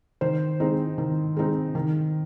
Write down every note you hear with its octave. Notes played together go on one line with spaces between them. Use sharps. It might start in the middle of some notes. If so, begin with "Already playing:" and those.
D#3 C5
G#3 C4 D#4
D#3
G#3 C4 D#4
D#3